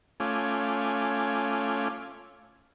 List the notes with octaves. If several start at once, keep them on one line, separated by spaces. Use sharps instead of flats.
A3 C#4 F4 G#5 D6